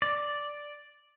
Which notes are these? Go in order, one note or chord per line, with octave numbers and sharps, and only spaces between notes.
D5